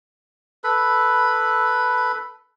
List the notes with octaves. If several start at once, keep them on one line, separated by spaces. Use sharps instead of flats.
A4 B4 B5